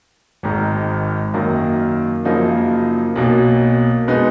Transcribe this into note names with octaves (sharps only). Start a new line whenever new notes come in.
G#1 G#2 D#3
F#2 D#3 A#3
F#2 C#3 F3 A#3 D#4
B1 B2 A#3
B2 G#3 B3 D#4